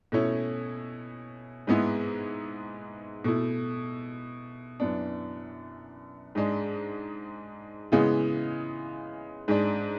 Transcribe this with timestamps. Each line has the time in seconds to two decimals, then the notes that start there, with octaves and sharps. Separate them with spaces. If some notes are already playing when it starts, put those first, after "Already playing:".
0.12 B2 A3 C#4 E4
1.67 G#2 G#3 B3 E4
3.24 B2 A3 E4
4.80 F#2 E3 B3 D4
6.35 G#2 G#3 D4
7.92 C#3 E3 G#3 B3
9.48 G#2 G#3 D4